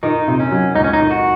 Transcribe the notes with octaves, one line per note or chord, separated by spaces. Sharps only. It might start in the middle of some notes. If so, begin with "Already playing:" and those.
D#3 D#4
C3
C#4
F#3
C#2 D#4
C#4
D#4
D#3
F#4